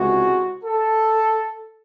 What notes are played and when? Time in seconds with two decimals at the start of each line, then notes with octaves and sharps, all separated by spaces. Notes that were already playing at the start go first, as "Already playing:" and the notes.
Already playing: C#2 C3 E3 G#3 F#4
0.64 A4